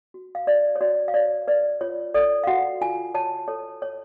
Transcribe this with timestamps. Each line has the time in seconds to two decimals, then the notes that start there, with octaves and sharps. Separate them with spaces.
0.14 F#4
0.35 F5
0.47 F#4 D5
0.76 C#5
0.81 F#4 D5
1.08 F5
1.14 C#5 D5
1.48 B4 D5
1.81 F4 C#5
2.14 A4 D5
2.44 F5
2.47 F#4 F#5
2.81 F4 G#5
3.14 C#5 A5
3.48 A4 C#5
3.82 C#5